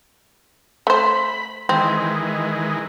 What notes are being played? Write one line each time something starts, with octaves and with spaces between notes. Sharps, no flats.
A3 C5 B5
D#3 E3 G#3 C4